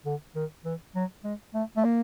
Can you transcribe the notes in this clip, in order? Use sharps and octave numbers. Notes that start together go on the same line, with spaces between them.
D3
D#3
E3
F#3
G#3
A3
A3
A#3